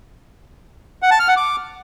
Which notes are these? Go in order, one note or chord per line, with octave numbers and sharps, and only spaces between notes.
F#5
A5
F6
F#5
D6